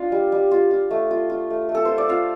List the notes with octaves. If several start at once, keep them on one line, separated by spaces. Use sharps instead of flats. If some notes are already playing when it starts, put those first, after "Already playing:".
Already playing: D4 F4 F5
G3
G3
F4
F4
A3
F4
F4
A3
A3
A4
F4 C5
D5
F4 F5